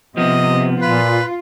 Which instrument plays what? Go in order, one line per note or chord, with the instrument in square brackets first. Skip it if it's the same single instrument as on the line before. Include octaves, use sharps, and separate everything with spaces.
[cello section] C3 [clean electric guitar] F3 B3 [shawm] D#5
[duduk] A#2 [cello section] F4 [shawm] B4